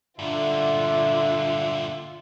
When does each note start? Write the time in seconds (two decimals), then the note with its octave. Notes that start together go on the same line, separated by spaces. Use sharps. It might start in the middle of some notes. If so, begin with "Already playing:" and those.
0.19 G2 A#2 D3 F4 E5